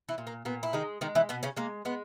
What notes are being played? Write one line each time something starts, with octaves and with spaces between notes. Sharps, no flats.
E3 E4
A#2
A#3
A#2 B3
E4
D#3 G#3 D#4
D#3 G#3 D#4
E3 E4
B2 B3
C#3 C#4
G#3 A#3
G#3 B3